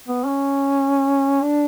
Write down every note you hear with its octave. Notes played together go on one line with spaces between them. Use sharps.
B3
C#4
D4